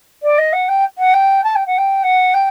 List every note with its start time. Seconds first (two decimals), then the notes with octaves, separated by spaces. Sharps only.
0.22 D5
0.38 D#5
0.52 F#5
0.68 G5
0.98 F#5
1.13 G5
1.43 A5
1.55 G5
1.66 F#5
1.77 G5
2.03 F#5
2.33 G5